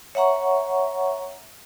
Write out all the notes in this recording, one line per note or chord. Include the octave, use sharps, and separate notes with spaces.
C#5 E5 F#5 A#5 C#6